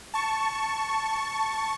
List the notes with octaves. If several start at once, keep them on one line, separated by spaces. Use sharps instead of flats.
A5 C#6